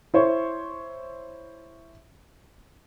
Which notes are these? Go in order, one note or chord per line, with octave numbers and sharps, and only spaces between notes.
E4 C5 C#5